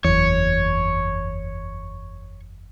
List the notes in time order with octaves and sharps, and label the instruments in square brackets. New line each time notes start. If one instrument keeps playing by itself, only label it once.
[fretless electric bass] F#1 E2 [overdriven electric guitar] C#5